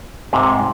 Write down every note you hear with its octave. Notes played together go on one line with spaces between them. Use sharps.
G#2 C3